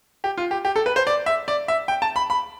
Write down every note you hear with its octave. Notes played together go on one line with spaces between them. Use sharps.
G4
F4
G4
G4
A4
B4
C5
D5
E5
D5
E5
G5
A5
B5
B5